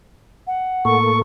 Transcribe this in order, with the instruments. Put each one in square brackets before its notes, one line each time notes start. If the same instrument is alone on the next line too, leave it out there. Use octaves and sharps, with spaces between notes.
[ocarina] F#5
[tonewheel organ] A2 A#3 A4 [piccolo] C#6